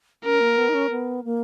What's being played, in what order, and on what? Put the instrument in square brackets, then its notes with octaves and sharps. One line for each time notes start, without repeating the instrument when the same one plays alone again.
[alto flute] C#4 [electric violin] A#4
[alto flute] A#3
B3
D#4
C#4
B3
A#3